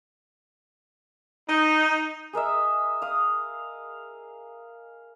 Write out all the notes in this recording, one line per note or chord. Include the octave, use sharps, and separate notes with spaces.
D#4
G#4 A#4 D#5 E5
F5 D#6